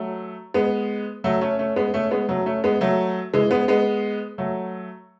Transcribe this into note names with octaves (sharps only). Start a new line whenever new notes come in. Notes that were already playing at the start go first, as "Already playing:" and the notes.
Already playing: F#3 A3
G#3 B3
F#3 A3
A3 C#4
A3 C#4
G#3 B3
A3 C#4
G#3 B3
F#3 A3
A3 C#4
G#3 B3
F#3 A3
E3 G#3
G#3 B3
G#3 B3
F#3 A3